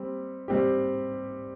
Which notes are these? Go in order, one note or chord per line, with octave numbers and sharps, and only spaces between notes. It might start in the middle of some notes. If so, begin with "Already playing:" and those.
Already playing: G3 C4 G4
G3 C4 G4